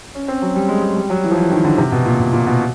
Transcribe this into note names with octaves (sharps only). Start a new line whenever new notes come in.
C#4
C4
F#3
G3
G#3
G#3
G3
F#3
E3
F3
E3
D#3
D3
C3
B2
A#2
B2
A#2
B2